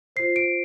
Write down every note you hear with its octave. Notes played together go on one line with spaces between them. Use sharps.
F4 C5 C7
D7